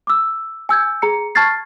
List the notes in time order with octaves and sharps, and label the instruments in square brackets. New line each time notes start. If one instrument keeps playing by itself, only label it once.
[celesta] D6 E6
G#5 E6 G6 G#6
G#4 A#5 C#7
A5 C#6 F6 G#6 A6 C7